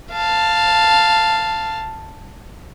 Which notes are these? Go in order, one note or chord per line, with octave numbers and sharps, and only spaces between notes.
F5 A5